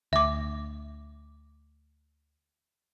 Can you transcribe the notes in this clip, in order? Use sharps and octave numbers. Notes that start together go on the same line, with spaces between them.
D2 E5 D6